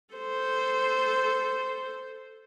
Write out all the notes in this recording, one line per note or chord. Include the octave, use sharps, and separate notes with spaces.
A4 C5